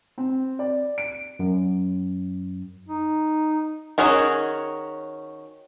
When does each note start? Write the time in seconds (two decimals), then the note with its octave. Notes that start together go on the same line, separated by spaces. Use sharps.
0.18 C4
0.59 D5
0.98 D7
1.39 F#2
2.89 D#4
3.98 D#3 C#4 F#4 G#4